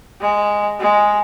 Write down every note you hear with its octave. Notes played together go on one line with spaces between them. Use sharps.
G#3
G#3